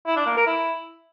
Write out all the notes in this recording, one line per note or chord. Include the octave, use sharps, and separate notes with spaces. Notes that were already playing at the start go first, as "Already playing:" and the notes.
E4
D4
A#3
A#4
E4